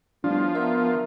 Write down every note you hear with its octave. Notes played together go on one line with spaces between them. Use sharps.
A2 F3 G3 B3 D4
B3 A#4 E5